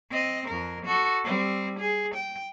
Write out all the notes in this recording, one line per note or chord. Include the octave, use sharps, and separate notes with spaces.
C4 D#5
F2 A#4
F#4 A4
G3 C4
G#4
G5